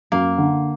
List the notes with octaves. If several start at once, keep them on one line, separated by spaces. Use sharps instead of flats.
F#2 A#3
D3